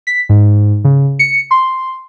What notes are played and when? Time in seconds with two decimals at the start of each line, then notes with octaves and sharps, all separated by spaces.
0.07 B6
0.29 G#2
0.85 C#3
1.19 C#7
1.51 C6